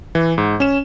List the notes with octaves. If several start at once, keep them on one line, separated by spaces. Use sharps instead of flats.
E3
G#2
C#4 E7